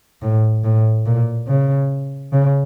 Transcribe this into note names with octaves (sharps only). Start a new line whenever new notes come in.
A2
A2
A#2
C#3
C#3